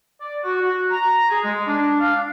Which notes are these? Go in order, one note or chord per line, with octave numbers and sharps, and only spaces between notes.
D5
F#4
F#4
A#5
G#4
G#3
D4
F5
D4